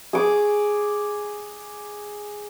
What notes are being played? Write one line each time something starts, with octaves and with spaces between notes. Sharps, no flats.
G#4 D6